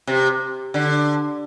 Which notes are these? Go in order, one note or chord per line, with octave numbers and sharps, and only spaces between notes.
C3
D3